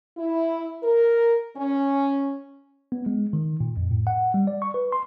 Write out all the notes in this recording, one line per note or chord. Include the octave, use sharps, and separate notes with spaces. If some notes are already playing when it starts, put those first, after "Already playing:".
E4
A#4
C#4
B3
G#3
D#3
A#2
F2
A2
F#5
G3
D5
C#6
B4
C6